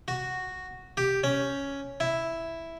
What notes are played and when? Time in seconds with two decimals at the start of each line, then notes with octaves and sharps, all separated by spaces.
0.08 F#4
0.97 G4
1.24 C#4
2.00 E4